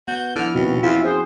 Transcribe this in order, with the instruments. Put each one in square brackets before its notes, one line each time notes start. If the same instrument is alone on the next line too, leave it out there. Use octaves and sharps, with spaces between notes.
[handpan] B3 [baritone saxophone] F#4 [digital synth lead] G6
[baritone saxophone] D3 [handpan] F3 E4 [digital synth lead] F6
[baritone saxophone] D#2 [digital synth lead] B2 [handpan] C4 C#4 F#4
[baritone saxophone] E2 [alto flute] E4 [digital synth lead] F4
[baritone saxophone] F#2 [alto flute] G#4 [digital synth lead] C5